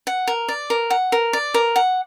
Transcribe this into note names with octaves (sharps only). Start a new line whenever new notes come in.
F#5
A#4
D5
A#4
F#5
A#4
D5
A#4
F#5